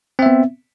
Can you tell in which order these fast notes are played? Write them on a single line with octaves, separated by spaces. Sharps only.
C4 E5 B3